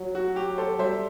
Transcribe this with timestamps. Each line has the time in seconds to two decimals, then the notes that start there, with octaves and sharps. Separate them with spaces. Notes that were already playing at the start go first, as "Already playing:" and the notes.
Already playing: F#3
0.15 F#4
0.36 G4
0.58 A4 C5
0.79 G3 C5 E5